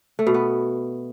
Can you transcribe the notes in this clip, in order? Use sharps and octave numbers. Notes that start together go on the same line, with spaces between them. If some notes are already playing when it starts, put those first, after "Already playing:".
A3
B2
B3